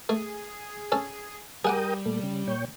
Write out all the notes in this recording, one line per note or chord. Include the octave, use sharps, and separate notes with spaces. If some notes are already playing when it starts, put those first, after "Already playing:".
A3 G#4
C#4 A4
G3 G#4 A#4 F#5 G5 D6 D#6
A#2 A3
C#3
A#2 C#5 G5